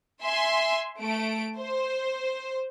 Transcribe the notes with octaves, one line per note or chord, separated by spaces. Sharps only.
E5 G#5 C6
A3 D7
C5